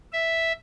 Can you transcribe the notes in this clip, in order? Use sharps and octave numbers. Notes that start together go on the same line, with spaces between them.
E5